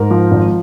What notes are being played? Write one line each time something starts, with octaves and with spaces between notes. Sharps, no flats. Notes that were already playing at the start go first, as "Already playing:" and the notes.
Already playing: G#2 A#4
F3
G#1